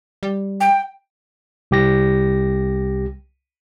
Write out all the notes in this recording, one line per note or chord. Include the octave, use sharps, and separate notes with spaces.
G3
G5
C2 G4 A#6